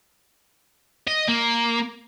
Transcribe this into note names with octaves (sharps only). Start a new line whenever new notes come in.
D#5
A#3